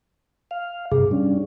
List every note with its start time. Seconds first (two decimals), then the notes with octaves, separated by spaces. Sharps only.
0.51 F5
0.92 G2 C3 G#4
1.11 G3 C#4 D4